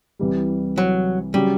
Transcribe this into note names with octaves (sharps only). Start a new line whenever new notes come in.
C2 C3 E3 G3
F#3
C#3 F#3 G3